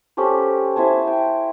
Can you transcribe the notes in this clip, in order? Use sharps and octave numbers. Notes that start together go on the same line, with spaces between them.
C#4 G4 A4 C5
E4 C5 G#5 A5
G5